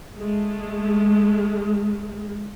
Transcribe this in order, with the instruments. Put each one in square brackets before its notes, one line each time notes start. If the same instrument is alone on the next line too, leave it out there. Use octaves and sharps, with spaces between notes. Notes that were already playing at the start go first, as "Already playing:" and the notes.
[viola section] G#3 A3